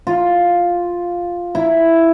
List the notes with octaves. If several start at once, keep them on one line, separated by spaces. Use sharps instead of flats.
F4
E4